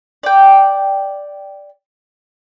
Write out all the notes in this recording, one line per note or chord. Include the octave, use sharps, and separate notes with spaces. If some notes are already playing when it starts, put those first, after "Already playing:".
D5 G5